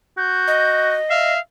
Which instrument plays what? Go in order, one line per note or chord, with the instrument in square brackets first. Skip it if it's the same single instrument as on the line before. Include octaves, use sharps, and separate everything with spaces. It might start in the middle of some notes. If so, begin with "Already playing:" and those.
[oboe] F#4 [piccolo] G6
[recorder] D#5
[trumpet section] E5 F5 [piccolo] C7